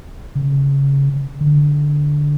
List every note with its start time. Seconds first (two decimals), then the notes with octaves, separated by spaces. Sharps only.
0.35 C#3
1.41 D3